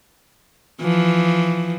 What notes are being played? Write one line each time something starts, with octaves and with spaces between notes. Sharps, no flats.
E3 F3